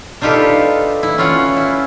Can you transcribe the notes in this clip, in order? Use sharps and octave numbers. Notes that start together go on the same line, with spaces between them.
D4 D#4 F4 G4 A4 B4
E4
C#4 F4 F#5
E4